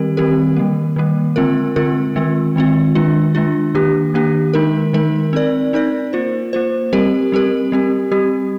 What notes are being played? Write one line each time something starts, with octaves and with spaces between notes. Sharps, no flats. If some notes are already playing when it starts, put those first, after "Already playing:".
Already playing: D#3 G3 C4 G4 A#4
D#3 G3 C4 G4 A#4
D#3 G3 A#3
D#3 G3 A#3
D3 G#3 C4 F4 A#4
D3 G#3 C4 F4 A#4
D#3 G#3 C4 F4
D#3 G#3 C4 F4
D#3 G#3 D4 F4
D#3 G#3 D4 F4
D#3 A#3 D4 G4
D#3 A#3 D4 G4
D#3 G#3 D#4 A#4
D#3 G#3 D#4 A#4
C4 D#4 A#4 D5
C4 D#4 A#4 D5
A#3 F4 C5
A#3 F4 C5
G3 C4 G4 A#4
G3 C4 G4 A#4
G3 C4 G4
G3 C4 G4